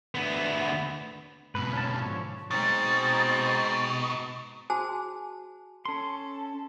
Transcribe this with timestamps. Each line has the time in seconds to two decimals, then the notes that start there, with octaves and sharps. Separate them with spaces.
0.15 D2 B3
1.55 G#2 B2 B4
1.73 C#4 A5
1.95 D3 F3 C#5
2.51 B2 G#3 C4 D#4 A6
4.70 F#4 G#4 C5 G#5 A5
5.85 C#4 A4 C6